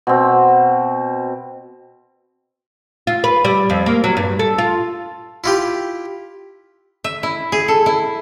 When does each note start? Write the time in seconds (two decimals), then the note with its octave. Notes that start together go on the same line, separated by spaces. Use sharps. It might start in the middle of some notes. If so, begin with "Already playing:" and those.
0.07 B2 C4
3.07 F4
3.24 B4
3.45 G3
3.70 F2
3.86 A#3
4.04 F#3
4.17 G2
4.39 A4
4.58 F4
5.44 E4 F4 G4
7.04 E5
7.23 E4
7.52 G#4
7.68 A4
7.86 E4